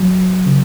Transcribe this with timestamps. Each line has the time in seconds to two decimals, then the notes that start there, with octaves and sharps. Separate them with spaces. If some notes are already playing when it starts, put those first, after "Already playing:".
Already playing: F#3
0.46 C#3